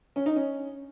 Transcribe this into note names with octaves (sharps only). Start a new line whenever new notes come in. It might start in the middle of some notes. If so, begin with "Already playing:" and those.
C#4
D#4
C#4